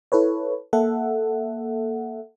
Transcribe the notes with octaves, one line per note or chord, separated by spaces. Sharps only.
E4 A4 B4 C#5
A#3 A4 E5 F#5